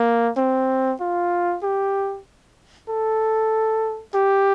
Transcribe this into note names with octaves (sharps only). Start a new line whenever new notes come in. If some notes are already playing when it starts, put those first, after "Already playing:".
Already playing: A#3
C4
F4
G4
A4
G4